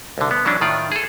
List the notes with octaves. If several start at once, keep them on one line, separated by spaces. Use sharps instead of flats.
C2 D3
B3
E3 F#3 C#4 D4
A2 D#3 F4 D5
G#4 A4